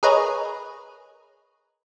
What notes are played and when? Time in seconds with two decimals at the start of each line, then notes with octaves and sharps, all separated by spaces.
0.03 G#4 A#4 B4 C#5 D#5